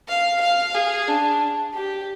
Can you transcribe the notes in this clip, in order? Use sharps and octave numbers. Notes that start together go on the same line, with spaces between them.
F5
F5
G#4
D4
G4